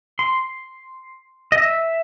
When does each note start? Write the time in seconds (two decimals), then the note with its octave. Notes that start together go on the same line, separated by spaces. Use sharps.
0.19 C6
1.52 D#5
1.57 E5